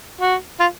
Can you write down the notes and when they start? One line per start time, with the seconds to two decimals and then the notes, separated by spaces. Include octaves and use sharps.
0.21 F#4
0.60 F4